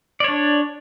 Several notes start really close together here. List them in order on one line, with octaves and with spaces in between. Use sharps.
D5 C#5 D4